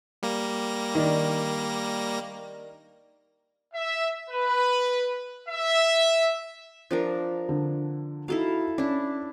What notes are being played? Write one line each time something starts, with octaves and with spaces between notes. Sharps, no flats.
G3 A#3 A#6
D#3 D4
E5
B4
E5
F3 D4 A#4
D3
D#4 E4 F#4 A4 F5
C#4 D4 E4